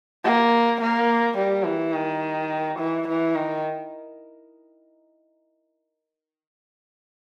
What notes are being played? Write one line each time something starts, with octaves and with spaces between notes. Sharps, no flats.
A#3
A#3
G3
E3
D#3
E3
E3
D#3